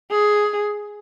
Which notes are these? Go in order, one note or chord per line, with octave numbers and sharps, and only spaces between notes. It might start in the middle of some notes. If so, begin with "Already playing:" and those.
G#4